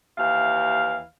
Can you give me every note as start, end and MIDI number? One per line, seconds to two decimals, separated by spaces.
0.18 1.05 39
0.18 1.05 52
0.18 1.05 76
0.18 1.05 77